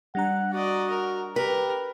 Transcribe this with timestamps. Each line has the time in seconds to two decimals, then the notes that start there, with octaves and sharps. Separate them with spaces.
0.15 G3 D4 F#5 A#5
0.53 F#4 D5 D#5
0.90 A#4
1.36 G4 A#4 B4